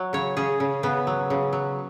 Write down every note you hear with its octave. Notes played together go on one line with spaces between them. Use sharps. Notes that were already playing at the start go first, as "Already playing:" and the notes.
Already playing: F#3
C#3 C#5
C#3 G#4
C#3
C#3 B3
F#3
C#3
F#3